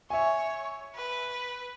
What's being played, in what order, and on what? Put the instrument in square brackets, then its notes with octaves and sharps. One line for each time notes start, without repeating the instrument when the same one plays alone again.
[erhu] C#5 [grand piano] E5 G#5
[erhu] B4